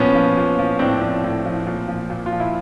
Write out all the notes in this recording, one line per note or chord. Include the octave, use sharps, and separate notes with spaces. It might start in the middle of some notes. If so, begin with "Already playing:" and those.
Already playing: A#2 F3 B3 C#4
F3
A#2
F3
A2 C4 D4
F3
A2
F3
A#2
F3
A#2
F4
F3
E4